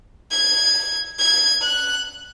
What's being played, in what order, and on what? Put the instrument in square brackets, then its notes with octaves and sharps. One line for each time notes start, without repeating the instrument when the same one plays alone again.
[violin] G#6
G#6
F#6